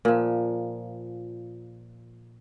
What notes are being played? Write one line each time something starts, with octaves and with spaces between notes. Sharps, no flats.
A#2 F3